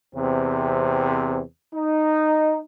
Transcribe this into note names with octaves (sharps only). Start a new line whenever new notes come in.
E2 C3 C4
D#4